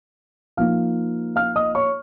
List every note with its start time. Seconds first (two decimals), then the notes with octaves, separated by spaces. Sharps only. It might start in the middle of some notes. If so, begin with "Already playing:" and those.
0.57 F3 A#3 D#4 F5 F6
1.36 F5 F6
1.56 D#5 D#6
1.75 C#5 C#6